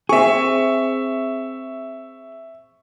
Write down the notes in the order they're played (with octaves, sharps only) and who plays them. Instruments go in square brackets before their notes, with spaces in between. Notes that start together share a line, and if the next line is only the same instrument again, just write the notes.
[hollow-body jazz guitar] C4 G#4 [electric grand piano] E5 C#6